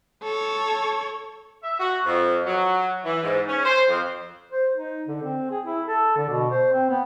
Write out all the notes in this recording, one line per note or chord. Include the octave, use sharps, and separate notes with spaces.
A4 C#5
E5
F#4
F2
F#3
E3
G#2
C#4
C5
F2
C5
D#4
D3
C4
G#4
E4
A4
D3
B2
C5
C4
B3